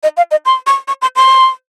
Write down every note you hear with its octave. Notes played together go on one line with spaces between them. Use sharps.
D#5
F5
D#5
C6
C#6
C#6
C6
C6